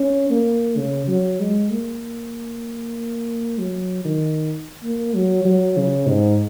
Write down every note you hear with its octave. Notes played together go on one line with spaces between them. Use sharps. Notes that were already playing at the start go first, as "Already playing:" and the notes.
Already playing: C#4
A#3
C#3
F#3
G#3
A#3
F#3
D#3
A#3
F#3
F#3
C#3
G#2